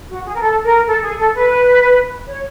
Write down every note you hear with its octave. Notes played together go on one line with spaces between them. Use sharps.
F#4
G#4
A#4
A4
A#4
A4
G#4
A4
B4
C#5